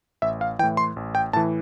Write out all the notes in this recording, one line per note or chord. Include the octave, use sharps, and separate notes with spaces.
A1 E5
F5
A2 E3 G5
C6
A1
G5
A2 E3 A5